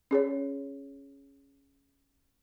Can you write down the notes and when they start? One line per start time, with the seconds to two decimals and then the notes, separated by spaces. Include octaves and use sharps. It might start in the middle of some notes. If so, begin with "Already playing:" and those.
0.11 C#4 G#4 C#5